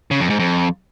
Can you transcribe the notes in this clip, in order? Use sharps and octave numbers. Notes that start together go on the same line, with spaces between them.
C#3
F2
G#2
F2